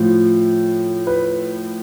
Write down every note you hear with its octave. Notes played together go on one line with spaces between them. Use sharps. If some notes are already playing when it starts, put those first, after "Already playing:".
Already playing: A2 F3
B4